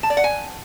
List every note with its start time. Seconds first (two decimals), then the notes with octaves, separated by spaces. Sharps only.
0.03 A5
0.10 D5
0.17 F#5
0.24 G#5